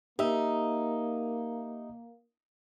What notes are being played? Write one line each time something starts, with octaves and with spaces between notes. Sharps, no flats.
A#3 D#4 G4 E5